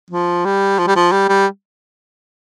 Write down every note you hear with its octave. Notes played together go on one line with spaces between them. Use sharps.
F3
G3
F3
G3
F3
G3
G3